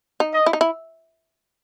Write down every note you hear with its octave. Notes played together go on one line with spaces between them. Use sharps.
D#4
D#5
E4
D#4
E4